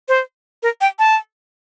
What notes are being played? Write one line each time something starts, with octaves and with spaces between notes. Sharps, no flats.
C5
A#4
G5
A5